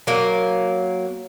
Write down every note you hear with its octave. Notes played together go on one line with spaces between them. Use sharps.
F#3 A#3